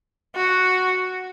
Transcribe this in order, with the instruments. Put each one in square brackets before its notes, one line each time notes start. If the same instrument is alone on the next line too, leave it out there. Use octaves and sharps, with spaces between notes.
[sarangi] F#4